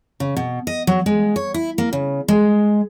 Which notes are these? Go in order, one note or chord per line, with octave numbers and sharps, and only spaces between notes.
C#3
B2
D#5
F#3
G#3
C#5
E4
A#3
C#3
G#3